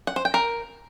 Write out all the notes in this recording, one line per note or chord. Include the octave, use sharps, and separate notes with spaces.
F#5
C5
G5
A#4